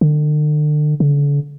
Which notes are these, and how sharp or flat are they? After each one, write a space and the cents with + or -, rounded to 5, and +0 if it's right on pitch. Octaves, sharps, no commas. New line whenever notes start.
D3 +40
D3 -40